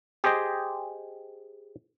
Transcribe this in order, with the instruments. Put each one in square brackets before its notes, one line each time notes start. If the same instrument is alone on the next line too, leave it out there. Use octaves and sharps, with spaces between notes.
[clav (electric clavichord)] G4 G#4 C5 D#5 G5